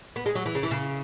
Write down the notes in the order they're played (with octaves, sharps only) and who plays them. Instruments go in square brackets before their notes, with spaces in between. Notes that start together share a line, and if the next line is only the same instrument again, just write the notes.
[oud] B3
G#3
F#3
E3
C#3
E3
C#3